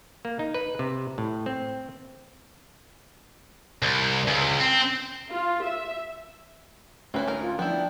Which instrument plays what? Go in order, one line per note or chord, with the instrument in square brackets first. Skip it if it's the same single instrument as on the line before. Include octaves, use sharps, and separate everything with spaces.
[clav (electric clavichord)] A#3
D#4
B4
C3
A2
C4
[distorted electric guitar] C2
C#2
C4
[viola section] F4
E5
[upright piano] D2 [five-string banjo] C4 B4 C5 [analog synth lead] C#4
[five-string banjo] D#4 A#4
[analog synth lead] F4
[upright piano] F3 D4 [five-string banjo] B3 E4 [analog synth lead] G5